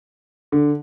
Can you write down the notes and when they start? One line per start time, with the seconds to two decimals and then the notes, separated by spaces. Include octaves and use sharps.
0.52 D3